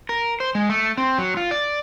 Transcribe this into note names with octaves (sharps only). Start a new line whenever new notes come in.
A#4
C5
G#3
A3
C4
F#3
F4
D5